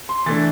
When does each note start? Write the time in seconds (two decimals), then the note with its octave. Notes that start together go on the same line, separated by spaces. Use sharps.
0.09 C6
0.26 E3 A3 D4 A6